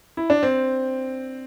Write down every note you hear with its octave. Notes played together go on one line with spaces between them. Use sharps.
E4
D4
C4